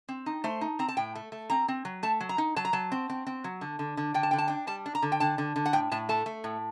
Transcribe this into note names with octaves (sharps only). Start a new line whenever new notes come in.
C4
D#4
A3 C5
D#4
C4 A#5
A5
A2 G5
A3
A3
C4 A#5
C4
F#3
A3 A5
F#3
A#5
D#4
F#3 A5
A#5
F#3 A5
C4
C4
C4
F#3
D3
D3
D3
D3 G5
A5
D3 G5
A5
D4 G5
G3 A5
D4
A#5
D3
G5
D3 A5
D3
D3
F#5
A2 G5
A2 A5
A3 A5
A3
A2